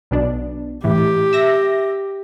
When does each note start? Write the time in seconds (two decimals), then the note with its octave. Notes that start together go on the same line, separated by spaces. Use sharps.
0.11 B1 B2 D4
0.84 A2 E3 G4
1.33 E5 A#6